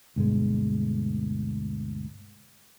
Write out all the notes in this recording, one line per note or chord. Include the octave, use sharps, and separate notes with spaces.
D2 G2 B2 G#3